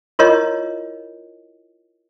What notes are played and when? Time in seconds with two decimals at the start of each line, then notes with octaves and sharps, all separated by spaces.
0.19 E4 F4 A#4 C#5 D#5